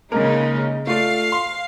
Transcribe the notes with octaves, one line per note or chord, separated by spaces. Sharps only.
C#3 G#3 A#3 D#4 A#4
A3 F4 D5 F5
C6